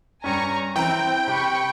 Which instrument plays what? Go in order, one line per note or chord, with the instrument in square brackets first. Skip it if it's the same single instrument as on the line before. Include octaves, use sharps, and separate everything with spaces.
[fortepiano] G2 C#4 [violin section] G#5 A#5 C#6
[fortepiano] E3 A#5 [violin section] C4 [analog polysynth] G5
[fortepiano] C3 [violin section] B5 C#6